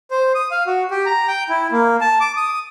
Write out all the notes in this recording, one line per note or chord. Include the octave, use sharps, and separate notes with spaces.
C5
D#6
F5
F#4
G4
A#5
G5
E4
A#3
A5
D6
D#6